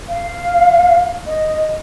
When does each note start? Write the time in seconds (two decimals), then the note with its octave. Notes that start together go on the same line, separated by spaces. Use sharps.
0.08 F5
1.26 D#5